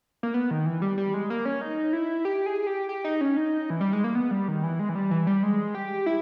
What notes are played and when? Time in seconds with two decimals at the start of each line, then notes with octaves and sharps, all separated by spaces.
0.23 A#3
0.34 B3
0.51 D#3
0.66 E3
0.82 G3
0.98 G3
1.14 G#3
1.30 A#3
1.45 C#4
1.61 D#4
1.93 E4
2.25 G4
2.46 G#4
2.67 G4
2.89 G4
3.04 D#4
3.21 C#4
3.37 D#4
3.70 E3
3.81 G3
3.93 G#3
4.04 A#3
4.15 B3
4.31 G3
4.48 D#3
4.64 E3
4.79 G#3
4.89 E3
4.95 G3
5.11 E3
5.27 G3
5.43 G#3
5.75 G4
6.06 E4